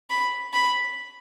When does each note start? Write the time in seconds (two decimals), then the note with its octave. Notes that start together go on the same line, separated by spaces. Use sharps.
0.10 B5
0.53 B5